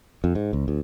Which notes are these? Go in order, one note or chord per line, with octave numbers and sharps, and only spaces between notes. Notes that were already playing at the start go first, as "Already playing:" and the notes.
F2
G#2
C#2
D2